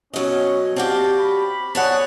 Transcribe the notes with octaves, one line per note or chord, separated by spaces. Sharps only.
B2 F#3 C#4 D#5
C4 F#4 G4 D5 F5 A5
B5
D4 G#4 C#5 F#5